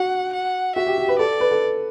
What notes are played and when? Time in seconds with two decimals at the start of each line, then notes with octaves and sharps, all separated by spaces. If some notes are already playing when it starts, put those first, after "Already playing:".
Already playing: F#4 F#5
0.33 F#5
0.75 F#4 E5
0.87 G4
0.98 G4
1.08 B4
1.19 A4 D5
1.40 B4
1.51 A4